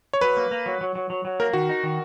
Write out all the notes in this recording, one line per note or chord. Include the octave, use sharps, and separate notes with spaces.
C#5
F#3 B4
A#3
A#3
F#3
F#3
F#3
F#3
F#3
A#3 A#4
D#3 F#4
D#4
D#3